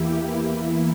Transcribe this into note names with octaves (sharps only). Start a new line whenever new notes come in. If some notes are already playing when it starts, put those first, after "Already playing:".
Already playing: E2 E3 A#3 E4 G4
E2 E3 A#3 E4